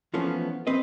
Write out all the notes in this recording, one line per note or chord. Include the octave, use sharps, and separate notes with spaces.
E3 F3 A3 B3 C#4
C4 B4 D#5